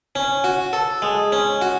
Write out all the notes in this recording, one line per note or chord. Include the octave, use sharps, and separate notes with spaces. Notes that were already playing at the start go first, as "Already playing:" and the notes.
C#4
F#4
A4
G#3
C#4
F#4